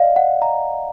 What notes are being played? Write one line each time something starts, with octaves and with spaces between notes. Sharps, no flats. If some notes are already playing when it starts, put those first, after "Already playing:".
Already playing: D5 D#5 F5
F#5
A#5